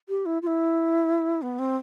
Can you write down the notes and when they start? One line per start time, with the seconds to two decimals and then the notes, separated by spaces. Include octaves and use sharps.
0.09 G4
0.26 E4
0.42 F4
0.47 E4
1.42 B3
1.59 C4